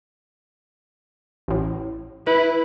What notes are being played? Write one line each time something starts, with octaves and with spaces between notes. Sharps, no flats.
A1 A2
E4 B4